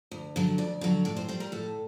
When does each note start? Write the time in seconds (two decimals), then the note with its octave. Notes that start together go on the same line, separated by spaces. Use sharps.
0.12 D2
0.36 D3 F#3
0.58 D2 D5
0.81 D3 F#3
1.05 A2 D5
1.17 C5
1.29 G3 C5
1.40 A#4
1.52 A2 A4